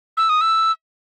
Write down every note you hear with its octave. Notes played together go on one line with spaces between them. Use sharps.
E6
D#6
E6